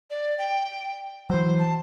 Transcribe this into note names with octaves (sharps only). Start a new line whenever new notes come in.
D5
G5
E3 F#3 C5
A5